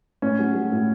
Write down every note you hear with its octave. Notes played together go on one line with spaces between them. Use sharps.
A2 C#4
F#3
F#3
A2